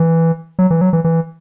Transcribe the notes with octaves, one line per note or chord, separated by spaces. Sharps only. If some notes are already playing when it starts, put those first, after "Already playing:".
Already playing: E3
F#3
E3
F#3
E3
E3